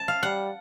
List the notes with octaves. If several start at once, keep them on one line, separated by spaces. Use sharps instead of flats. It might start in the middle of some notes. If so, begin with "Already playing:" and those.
Already playing: A5
F5
G3 F#5